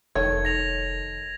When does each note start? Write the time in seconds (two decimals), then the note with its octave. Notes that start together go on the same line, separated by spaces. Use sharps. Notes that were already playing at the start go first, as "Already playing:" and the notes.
0.15 F1 D#3 A4 C#5 G#6
0.45 A#6 F7